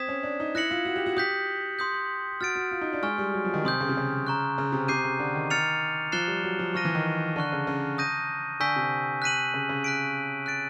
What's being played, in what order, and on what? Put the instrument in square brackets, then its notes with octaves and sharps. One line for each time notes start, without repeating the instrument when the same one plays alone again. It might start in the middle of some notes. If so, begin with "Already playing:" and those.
Already playing: [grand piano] C4 [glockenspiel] D#6 G#6 B6 E7
[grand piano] C#4
D4
D#4
[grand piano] E4 [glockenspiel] F#6 A#6 C#7 F#7
[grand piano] F4
F#4
G4
F#4
[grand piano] G4 [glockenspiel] D#6 G6 B6
[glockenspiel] C6 D#6 G6
[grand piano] F#4 [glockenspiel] F6 A6 D7
[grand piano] F#4
F4
D#4
D4
[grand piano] G#3 [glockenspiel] G#5 C#6 F6
[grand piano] G3
F#3
F3
D#3
[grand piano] C3 [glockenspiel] C6 D#6 G6
[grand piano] C#3
C3
C#3
[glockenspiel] A#5 C#6 F#6
[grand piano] C#3
C3
[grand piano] C3 [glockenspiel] D6 G6 C7 D#7
[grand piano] C#3
D3
D#3
[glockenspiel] F6 A6 C#7 F7
[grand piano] F3 [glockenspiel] F#6 A6 C7 E7 G7
[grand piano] G3
F#3
F3
[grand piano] F3 [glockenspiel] C#6 F6 A#6 D#7
[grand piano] E3
D#3
[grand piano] D3 [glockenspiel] A5 C#6 F#6
[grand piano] C#3
C#3
[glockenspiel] D#6 G6 A#6 D#7
[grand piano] D3 [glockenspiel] G#5 C#6 E6 G6 B6
[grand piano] C3
[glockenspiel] F#6 B6 D#7 F#7
[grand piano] C#3
C#3
[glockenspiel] F#6 B6 D7
F#6 A6 D7